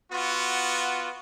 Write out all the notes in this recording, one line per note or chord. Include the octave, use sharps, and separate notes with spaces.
B3 F4 F#4